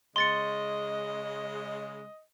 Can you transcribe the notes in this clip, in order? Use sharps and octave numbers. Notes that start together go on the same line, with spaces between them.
C#3 G#3 D#5 C6 A6 C#7